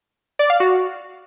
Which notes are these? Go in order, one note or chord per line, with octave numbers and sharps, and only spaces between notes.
D5
F5
F#4